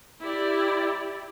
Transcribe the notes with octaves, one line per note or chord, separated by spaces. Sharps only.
E4 G4 D5